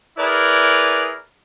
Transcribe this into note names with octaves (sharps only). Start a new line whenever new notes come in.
E4 G#4 A#4 B4 D5